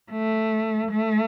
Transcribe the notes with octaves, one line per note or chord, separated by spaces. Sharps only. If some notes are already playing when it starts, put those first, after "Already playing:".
A3
A3